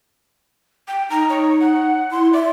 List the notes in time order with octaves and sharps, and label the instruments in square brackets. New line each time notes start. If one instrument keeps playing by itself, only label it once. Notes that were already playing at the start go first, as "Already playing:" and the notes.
[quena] G5
[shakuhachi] D#4 [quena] A#5
[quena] C#5
F#5
[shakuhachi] E4 [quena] C6
[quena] D5 [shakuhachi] E5